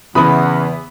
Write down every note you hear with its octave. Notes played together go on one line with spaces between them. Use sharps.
E2 C#3 E3 B3 B5 D#6